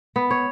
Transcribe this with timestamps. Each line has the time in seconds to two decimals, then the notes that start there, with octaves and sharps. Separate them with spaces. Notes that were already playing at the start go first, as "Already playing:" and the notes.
0.16 B3
0.31 C#5